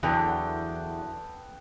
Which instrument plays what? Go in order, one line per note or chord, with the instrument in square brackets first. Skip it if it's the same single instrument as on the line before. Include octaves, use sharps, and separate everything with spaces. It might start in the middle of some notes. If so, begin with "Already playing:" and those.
[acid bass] E2 [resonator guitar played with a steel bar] D3 E3 F#3 [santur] B3 A4 G5